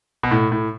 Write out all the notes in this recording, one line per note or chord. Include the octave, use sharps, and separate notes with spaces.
B2
A2
A2